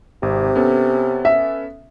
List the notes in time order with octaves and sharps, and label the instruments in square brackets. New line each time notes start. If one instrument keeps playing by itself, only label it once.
[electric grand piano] G#1 [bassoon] C3
[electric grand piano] B3 C#4 A4
[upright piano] E5